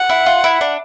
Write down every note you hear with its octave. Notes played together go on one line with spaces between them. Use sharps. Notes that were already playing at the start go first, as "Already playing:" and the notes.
Already playing: F#5
E4
F4
E4
D4